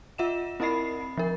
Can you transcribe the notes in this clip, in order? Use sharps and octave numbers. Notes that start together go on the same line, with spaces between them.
F4 E5 F#5 E7
C4 E4 A#4 D#5 B5 C7
F3 A#4